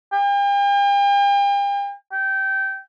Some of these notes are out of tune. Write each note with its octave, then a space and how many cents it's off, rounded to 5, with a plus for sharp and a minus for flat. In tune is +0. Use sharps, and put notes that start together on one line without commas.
G5 +40
G5 -20